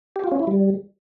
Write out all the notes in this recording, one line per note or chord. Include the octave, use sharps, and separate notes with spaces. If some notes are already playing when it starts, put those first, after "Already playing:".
G4
F4
C#4
E4
G3